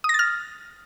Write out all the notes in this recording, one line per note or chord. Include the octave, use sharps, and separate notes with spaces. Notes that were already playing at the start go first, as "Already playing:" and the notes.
D#6 F6 A6 A#6